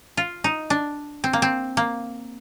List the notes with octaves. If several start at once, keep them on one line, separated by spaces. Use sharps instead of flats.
F4
D#4
D4
C4
A#3
C4
A#3